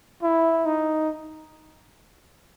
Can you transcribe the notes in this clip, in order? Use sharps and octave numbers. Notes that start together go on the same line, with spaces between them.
E4
D#4